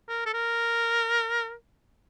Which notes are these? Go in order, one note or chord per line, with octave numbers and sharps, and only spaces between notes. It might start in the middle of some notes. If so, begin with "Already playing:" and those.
A#4
A4
A#4